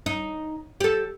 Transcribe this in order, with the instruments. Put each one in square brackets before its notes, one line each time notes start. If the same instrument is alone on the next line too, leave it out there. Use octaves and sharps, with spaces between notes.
[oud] D#4
G4 A4